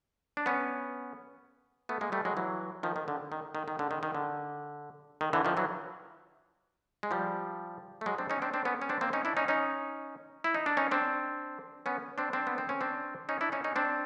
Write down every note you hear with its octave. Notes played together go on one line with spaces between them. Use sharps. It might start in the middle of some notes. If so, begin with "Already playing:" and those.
D4
B3 C#4
A3 B3
G#3 A#3
G3 A3
F#3 G#3
E3 F#3
D#3 F3
D#3
D3
D#3
D#3
D#3
D3
D#3
D#3
D3
D#3
D3 E3
D#3 F3
E3 F#3
G#3
F3 G3
A3
F#3 G#3
C4 D4
C#4 D#4
C4 D4
C4 D4
B3 C#4
C#4
C4 D4
A#3 C4
C#4 D#4
D4 E4
C#4 D#4
C#4 D#4
E4
D#4
D4
C#4 D#4
C4 D4
B3 C#4
C4 D4
C4 D4
B3
C4
C#4
C4 D4
C#4 D#4
D4 E4
C#4 D#4
C#4 D#4
C4 D4